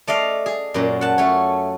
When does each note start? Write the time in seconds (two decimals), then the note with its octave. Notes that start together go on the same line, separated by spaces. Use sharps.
0.07 A3 D5 D#5 F5
0.46 G#4
0.74 F#2 A#2
1.01 F#5 A5
1.18 A3 C#4 C#5